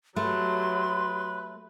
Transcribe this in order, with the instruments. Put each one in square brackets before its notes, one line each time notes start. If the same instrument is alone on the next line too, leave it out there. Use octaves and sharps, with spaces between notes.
[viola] F#3 G4 [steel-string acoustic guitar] A3 [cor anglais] B4 [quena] C6